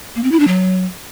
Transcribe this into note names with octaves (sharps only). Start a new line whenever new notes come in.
A#3
C4
E4
D4
F#3